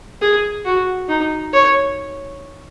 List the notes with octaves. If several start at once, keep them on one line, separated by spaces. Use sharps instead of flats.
G#4
F#4
D#4
C#5